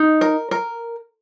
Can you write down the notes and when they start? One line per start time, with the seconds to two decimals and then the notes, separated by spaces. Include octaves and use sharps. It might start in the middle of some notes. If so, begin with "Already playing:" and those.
Already playing: D#4
0.21 A#4
0.51 A#4